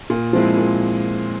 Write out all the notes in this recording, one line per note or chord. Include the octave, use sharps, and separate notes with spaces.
A#2
F3 G#3 C4 E4
A#2